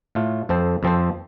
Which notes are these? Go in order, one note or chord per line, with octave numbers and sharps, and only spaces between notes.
A2 A3 F4
F2 F3 C4 A4 C5
F2 F3 C4 A4 C5